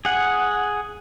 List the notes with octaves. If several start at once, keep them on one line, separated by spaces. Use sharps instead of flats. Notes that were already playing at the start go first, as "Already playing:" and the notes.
G#4 F#5